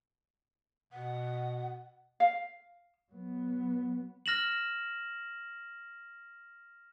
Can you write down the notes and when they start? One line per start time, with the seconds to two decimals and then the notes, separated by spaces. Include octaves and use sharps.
0.93 B2 F#5
2.20 F5
3.12 F#3 B3
4.26 F6 A#6 E7 F#7